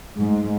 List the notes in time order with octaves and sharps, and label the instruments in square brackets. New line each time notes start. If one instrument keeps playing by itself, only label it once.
[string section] G#2